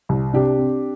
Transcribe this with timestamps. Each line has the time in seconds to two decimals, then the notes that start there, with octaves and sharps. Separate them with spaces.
0.09 C2
0.33 C3 D4 G4
0.59 C4